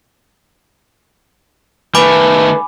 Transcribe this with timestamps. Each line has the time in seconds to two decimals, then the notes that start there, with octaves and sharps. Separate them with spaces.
1.95 D#3 A3 B4 G#5 B5 D6